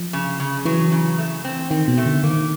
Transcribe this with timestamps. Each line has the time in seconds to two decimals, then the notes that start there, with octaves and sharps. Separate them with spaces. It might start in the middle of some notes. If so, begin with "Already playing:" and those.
Already playing: F3
0.13 C#3
0.40 C#3
0.65 E3 F#3
0.92 C#3
1.18 A3
1.44 C4
1.71 D#3 C4
1.88 B2
1.97 A3
2.06 D3
2.23 D#3 A#3